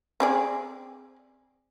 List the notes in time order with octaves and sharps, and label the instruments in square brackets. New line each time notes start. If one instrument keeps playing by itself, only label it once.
[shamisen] C4 G#4 D5